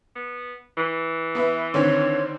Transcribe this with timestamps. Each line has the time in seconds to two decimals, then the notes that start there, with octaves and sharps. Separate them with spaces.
0.16 B3
0.77 E3
1.35 B3 B4 E5
1.74 D3 D#3 C4 C#5